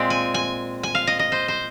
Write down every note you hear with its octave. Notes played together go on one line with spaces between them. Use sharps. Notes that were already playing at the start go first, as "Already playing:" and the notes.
Already playing: A#2 G#3 C4
G#5
G#5
G#5
F5
D#5
D#5
C5
C5